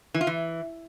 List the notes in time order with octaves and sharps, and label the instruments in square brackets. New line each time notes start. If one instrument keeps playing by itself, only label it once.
[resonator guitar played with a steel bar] E3
F4
E3